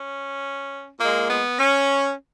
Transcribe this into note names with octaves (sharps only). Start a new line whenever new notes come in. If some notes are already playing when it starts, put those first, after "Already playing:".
Already playing: C#4
A#2 G#3 A#3
B3
C#4